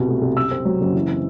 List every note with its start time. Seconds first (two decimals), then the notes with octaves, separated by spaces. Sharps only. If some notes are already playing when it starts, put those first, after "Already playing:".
Already playing: C2 B2
0.08 A3
0.22 C2
0.36 F#2 E6
0.51 C4
0.65 F#3
0.81 F#1
0.95 E3
1.09 C4